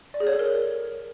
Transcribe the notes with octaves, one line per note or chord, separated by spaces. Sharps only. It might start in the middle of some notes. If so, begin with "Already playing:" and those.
D5
G#4
C#5
A4
A#4